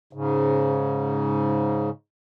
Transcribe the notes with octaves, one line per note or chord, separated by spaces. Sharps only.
G#2 C#3